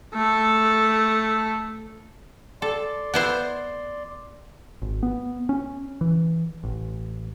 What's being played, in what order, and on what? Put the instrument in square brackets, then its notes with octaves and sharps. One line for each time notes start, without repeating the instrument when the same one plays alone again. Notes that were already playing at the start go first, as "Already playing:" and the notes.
[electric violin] A3 A4
[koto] A4 [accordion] D5 C6
[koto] B3 E4 C5
[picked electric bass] G#1
B3
C#4
E3
A1